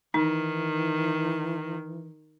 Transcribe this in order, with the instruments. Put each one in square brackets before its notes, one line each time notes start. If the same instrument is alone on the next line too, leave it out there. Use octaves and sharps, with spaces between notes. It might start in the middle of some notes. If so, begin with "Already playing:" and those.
[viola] D#3 [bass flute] E3 [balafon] D#4